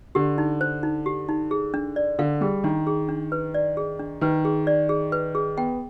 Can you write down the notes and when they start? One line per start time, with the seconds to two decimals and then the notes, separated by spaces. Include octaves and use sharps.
0.15 D3 G4
0.38 D#4
0.61 C5
0.83 D#4
1.06 G4
1.29 D#4
1.51 G#4
1.74 D4
1.96 D5
2.19 D3 F5
2.41 G3 G#4
2.64 D#3 D4
2.87 G#4
3.09 D4
3.32 B4
3.54 D5
3.77 G#4
3.99 D4
4.21 D#3 B4
4.45 G#4
4.67 D5
4.89 G#4
5.12 B4
5.35 G#4
5.57 B3 G5